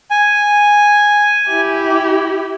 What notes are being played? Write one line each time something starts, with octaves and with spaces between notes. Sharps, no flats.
G#5
E4 G4